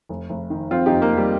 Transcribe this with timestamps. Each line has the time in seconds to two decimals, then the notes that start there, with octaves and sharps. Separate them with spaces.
0.09 F1
0.30 F1
0.50 D#3
0.71 F2 C4 F4
0.86 D#4 G4
0.91 F1
1.02 A#3
1.12 F1
1.17 G3